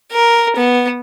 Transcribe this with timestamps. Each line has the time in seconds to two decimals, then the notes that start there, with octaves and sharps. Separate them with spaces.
0.12 A#4
0.56 B3